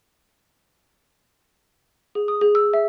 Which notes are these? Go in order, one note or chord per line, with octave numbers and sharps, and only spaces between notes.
G#4
D#6
G#4
E6
E5